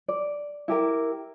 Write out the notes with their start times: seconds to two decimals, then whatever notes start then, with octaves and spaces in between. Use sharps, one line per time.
0.08 D5
0.68 E4 G4 A#4